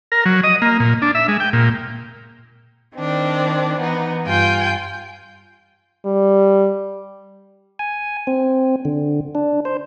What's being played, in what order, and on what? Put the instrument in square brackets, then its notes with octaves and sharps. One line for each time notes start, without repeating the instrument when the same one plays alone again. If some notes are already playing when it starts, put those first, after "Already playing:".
[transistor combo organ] A#4
F#3
D#5
A#3
A#2
D4
E5
G#3
G5
A#2
[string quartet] D#3 C4 D4
E3 B3 D#4
G2 F4 G5 G#5 G6
[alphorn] G3
[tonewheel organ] G#5
C4
D3
D4
C5